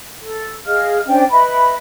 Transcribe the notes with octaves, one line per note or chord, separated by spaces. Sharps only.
A4
G#4 D#5 F5 F6
C#4 D4 C5 G5
B4 D#5 E5 B5